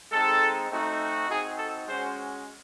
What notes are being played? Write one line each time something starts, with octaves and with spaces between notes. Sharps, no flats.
G#3 C4 D#4 A4
A3 C4 D#4 F#4
C4 D#4 F#4 G#4
A4
G#3 C#4 F#4 C5